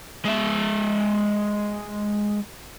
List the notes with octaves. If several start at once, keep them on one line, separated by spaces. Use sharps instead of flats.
G#3 E5